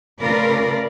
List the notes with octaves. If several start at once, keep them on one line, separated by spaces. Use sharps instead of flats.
C#3 A3 F4 A#4 B4 D5